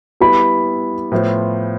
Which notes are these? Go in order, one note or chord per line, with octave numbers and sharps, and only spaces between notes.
G3 B3 E4 B5
A2 F3 B3 F4 C5